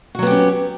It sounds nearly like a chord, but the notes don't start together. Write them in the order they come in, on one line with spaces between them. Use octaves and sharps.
F#4 F#3 B3 G4 C#4